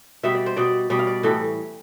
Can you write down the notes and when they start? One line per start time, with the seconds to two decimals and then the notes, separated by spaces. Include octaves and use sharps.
0.23 B2 G3 E5
0.35 D5
0.46 C5
0.56 B2 G3 D5
0.90 B2 G3 D5
0.99 F5
1.07 D5
1.23 A2 E3 G3 A4